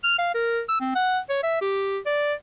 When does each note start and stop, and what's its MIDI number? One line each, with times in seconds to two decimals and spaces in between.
0.04 0.17 89
0.19 0.30 77
0.34 0.62 70
0.69 0.79 88
0.81 0.95 60
0.95 1.19 78
1.29 1.40 73
1.43 1.60 76
1.61 1.99 67
2.06 2.34 74